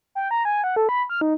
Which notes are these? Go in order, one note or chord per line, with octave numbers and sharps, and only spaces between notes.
G5
A#5
G#5
F#5
A4
B5
F6
D#4